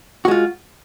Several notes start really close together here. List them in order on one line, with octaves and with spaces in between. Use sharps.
F#4 G#3 F4